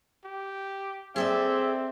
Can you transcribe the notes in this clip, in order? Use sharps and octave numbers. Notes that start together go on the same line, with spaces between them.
G4
C4 G#4 A4 D5 E5